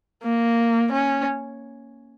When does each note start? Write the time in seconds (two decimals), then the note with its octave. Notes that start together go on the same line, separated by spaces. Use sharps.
0.23 A#3
0.92 C#4